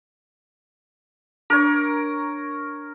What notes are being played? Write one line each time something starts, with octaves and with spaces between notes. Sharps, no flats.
D4 A#4 C#5